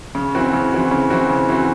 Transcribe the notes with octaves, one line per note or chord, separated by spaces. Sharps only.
C#3
E3 C4 F#4
C#3
E3 C4 F#4
C#3
E3 C4 F#4
C#3
E3 C4 F#4